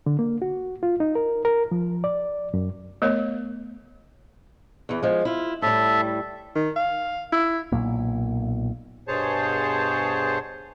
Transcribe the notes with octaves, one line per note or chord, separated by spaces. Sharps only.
D3
A#3
F#4
F4
D#4
A#4
A#4
F3
D5
F#2
A3 B3 A#4 C#5
E2 E3
F3 G#3
E4 F4
A2 G3 A4 E5
D#3
F5
E4
B1 A#2 A#3
G2 B2 G#4 C5 C#5 A5